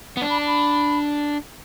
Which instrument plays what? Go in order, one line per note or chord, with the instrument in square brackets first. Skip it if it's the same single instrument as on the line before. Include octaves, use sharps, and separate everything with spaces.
[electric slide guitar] B3
D4
[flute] B5
A5
B5